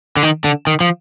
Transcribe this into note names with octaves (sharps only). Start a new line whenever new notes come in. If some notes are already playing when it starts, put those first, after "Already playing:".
D3
D#3
D3
D#3
F3